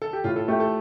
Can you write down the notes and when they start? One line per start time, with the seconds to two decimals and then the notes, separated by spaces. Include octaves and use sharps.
0.02 A4
0.13 G4
0.24 A2 F4
0.36 A4
0.48 A3 G4
0.60 A4